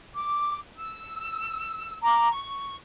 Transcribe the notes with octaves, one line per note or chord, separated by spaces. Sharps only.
D6
E6
A#5 D6
C#6